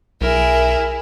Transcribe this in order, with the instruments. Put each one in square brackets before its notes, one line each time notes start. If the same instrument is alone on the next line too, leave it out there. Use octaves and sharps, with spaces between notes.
[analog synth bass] B1 [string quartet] E4 G#4 [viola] A#4